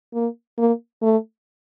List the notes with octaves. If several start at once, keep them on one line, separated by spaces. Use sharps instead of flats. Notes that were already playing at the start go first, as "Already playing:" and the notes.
A#3
A#3
A3